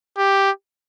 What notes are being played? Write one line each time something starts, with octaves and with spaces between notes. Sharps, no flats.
G4